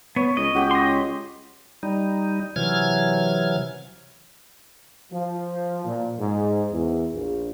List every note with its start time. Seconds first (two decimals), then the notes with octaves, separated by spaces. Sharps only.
0.16 B3 C#5
0.37 C#2 D#5
0.55 C#2 F#4 G4 G5
0.71 D#5 C6
1.83 G3 D#4
2.56 C3 E3 F#3 F6 G#6
5.12 F3
5.85 A#2
6.19 G#2
6.71 E2
7.13 A#1